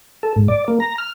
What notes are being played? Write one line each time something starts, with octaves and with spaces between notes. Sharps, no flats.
A4
G#2
D5
A#3
A#5
F6